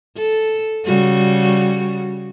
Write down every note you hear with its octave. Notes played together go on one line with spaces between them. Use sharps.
A4
C#3 G3 F#4